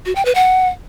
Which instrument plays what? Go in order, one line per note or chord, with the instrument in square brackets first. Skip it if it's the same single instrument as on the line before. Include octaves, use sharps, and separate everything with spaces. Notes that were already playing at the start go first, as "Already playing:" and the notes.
[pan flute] F#4
G5
B4
F#5